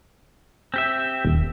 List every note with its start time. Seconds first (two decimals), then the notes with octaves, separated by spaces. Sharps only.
0.74 C4 G4 E5
1.25 D#1